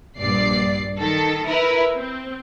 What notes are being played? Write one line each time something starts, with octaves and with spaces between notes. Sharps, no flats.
A#1 G2 D5 C7
D#3 A4
E4 A#4 B4
C4